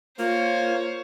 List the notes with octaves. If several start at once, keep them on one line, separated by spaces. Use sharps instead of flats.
A#3 F4 C5 C#5